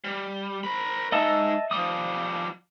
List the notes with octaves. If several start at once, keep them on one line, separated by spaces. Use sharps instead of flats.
G3
A#4 B5
G#3 D#4 D#5 E5 A5
F3 G3 D#6